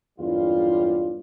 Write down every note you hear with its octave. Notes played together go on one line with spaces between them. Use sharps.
F#1 E2 G2 G3 F4